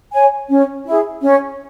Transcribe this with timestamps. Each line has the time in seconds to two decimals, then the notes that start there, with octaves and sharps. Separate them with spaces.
0.12 C#5 G#5
0.49 C#4
0.85 E4 G#4
1.22 C#4